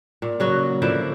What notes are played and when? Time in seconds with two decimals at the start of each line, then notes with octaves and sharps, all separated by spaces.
0.22 A#2
0.40 C#3 F#3 F#4
0.82 D3 F3 A#3 E4